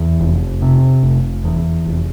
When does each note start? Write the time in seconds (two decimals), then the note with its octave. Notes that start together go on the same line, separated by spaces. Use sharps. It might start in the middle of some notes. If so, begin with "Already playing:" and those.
Already playing: E2
0.20 F1
0.62 C3
1.03 F1
1.44 E2
1.86 F1